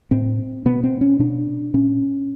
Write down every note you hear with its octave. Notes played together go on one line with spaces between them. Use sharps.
A2 C4
B2 B3
C4
C#4
B2 D4
A#2 C#4